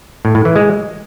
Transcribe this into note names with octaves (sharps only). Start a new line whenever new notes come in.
A2
A2
E3
G#3